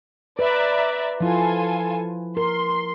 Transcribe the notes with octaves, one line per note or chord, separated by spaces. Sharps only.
B4 D5 E5 A#5
F3 E4 F4 A4 G#5
A#4 C6